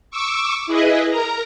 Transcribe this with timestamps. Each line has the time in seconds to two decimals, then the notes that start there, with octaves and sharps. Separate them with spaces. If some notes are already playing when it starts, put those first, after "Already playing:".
0.11 C#6 D6 E6
0.67 E4 G#4 B4 D#5
1.09 A#4 A#5